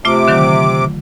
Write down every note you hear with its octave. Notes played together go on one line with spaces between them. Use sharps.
C3 A3 F4 E5 D6
D3 D#3 F#3